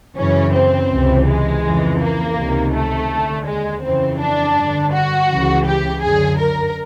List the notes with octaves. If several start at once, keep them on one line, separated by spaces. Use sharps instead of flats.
F#2 C#3 E3 C#4
C4
C#2 C3 E3
G#3
F2 C#3 E3
A#3
C#2 C3 D#3
A3
D#2 D3
G#3
F2 C#3 E3 C4
D4
G2 D3
F#4
C#2 C#3 E3
G4
F#2 D3 G#4
A#4